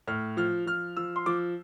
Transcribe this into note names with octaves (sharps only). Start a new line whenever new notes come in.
A2 F6
F3 F6
F3 F6
F3 E6
C6
F3 D6